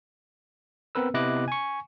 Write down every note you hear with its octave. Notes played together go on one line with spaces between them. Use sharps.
B3 C4 A#4 B4 E6
C3 B3 E4 D#5 D6 F#6
G#5 C#6